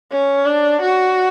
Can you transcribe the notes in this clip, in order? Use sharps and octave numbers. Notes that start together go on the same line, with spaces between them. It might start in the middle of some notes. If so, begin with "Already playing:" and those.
C#4
D4
F#4